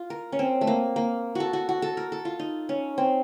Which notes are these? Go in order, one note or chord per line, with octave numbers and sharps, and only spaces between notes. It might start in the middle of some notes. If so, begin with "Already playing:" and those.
Already playing: F4
A#4
C#4
C4
A3
A#3
A#3
F#4 A4
F#4
F#4
A4
A#4
A4
F4
D#4
C#4
C4